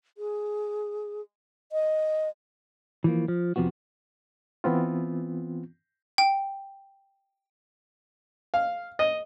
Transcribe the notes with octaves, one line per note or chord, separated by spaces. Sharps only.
G#4
D#5
E3 F3 A#3
F3
F2 C3 F3 B3 F#4
E3 B3 C4 F4
G5
F5
D#5